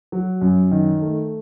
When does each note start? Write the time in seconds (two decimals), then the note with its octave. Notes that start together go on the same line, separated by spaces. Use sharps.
0.12 F#3
0.41 F#2
0.71 D#3
1.01 A3